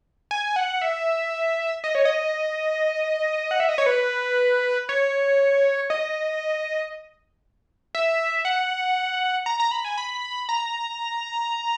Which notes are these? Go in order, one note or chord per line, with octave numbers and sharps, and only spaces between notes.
G#5
F#5
E5
D#5
C#5
D#5
F#5
E5
D#5
C#5
B4
C#5
D#5
E5
F#5
A#5
A#5
B5
G#5
B5
A#5